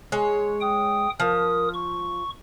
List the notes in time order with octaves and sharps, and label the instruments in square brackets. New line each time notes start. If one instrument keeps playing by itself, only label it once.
[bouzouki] G#3 C#5
[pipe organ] G5 D#6
[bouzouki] F3 [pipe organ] A#4 D#6
[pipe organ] C#6